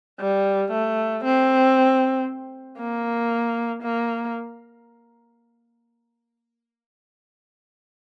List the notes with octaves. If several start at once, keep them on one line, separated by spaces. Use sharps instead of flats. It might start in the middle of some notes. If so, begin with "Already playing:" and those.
G3
A3
C4
A#3
A#3